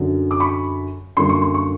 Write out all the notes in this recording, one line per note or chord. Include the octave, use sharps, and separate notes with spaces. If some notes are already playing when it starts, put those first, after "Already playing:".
Already playing: F#2 D3 F#3
D6
B5 C#6
F#2 D3 G3 A#3 C6
C#6
C6
C#6